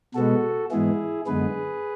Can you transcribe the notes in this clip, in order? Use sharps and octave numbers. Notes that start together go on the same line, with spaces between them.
B2 G#3 B3 F#4 A4
G#2 E3 G#3 B3 E4 G#4
F#2 D3 G#3 B3 G#4 B4